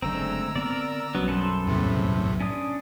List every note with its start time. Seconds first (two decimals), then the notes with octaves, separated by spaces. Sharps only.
0.02 F#1 F#2 D3 G#3 A3 C4 A#5 E6
0.56 D3 B3 C4 A#4 D5
1.15 B1 F#3 G3 B3 C#4
1.28 F#2 A4 B4 C5
1.67 E2 A2 C3
2.40 C#4 D4 D#6